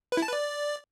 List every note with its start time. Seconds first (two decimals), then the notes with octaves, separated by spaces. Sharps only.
0.12 B4
0.17 E4
0.22 A5
0.28 B4
0.33 D5